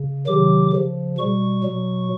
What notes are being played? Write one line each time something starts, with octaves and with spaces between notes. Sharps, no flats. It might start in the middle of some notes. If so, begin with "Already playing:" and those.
Already playing: C#3
C3 D#3 F#3 D6
C#3 F3
B2 G3 C#6
B2 F#3